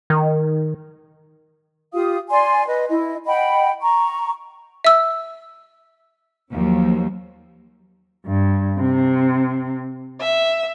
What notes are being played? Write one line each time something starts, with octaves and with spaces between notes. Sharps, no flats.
D#3
F4 G4 F5 D#6
D5 G#5 C6
B4 D#5
E4 D#5
D#5 F#5 G5 B5
A#5 C#6
E5 E6
D#2 F3 F#3
G2
C3
E5